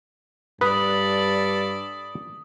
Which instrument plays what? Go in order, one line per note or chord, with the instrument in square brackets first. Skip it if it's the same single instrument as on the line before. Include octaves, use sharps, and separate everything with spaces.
[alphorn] G2 [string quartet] A4 D5 B5 [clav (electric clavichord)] B4 [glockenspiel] D#6